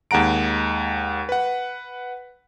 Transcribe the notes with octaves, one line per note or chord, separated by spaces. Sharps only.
D#2 G#3 F#5 A#5 D7
B4 F#5